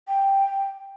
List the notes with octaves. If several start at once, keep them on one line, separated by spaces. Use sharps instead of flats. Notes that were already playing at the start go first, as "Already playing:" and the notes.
G5